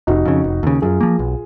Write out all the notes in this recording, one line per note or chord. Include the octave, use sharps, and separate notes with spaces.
F1 D#4 F#4
F2 C#3
F1
D#2 C#3
F#2 F4 G#4
F3 A#3
B1